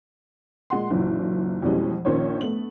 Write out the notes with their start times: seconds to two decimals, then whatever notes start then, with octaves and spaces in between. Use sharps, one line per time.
0.70 A#2 G#3 F#5 C6
0.90 F#1 B1 A#2 E3 F#3
1.62 F2 B2 E3 G3 G#3 C#4
2.05 A#1 A#2 D#3 C#4 C5 C#5
2.41 A3 B3 F#7